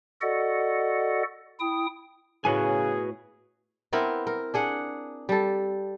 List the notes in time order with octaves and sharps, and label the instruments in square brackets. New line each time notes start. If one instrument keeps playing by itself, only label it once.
[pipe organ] F#4 A4 D5 D#5 F#5
E4 G5 D#6
[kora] A2 [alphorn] C#3 [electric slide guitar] F#4 B4 G#5 [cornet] G#4
[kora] B3 C4 E4 A#4
A#4
D4 G#4 F#5
G3 A4